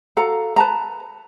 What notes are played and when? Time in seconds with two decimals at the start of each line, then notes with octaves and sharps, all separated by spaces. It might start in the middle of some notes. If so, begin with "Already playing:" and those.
0.17 F#4 A4 F5 A#5
0.56 B4 A5 A#5